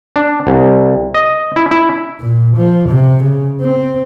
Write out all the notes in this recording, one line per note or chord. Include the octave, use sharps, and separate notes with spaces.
D4
C2
D#5
E4
E4
A#2
F3
C3
C#3
C4